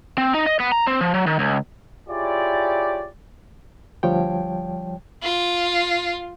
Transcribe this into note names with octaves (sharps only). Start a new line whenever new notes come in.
C4
D#4
D#5
B3
A#5
C4
F3
F#3
D#3
C#2
E4 F4 G4 G#4 C#5 D5
D2 F3 G3 C#5 G5
F4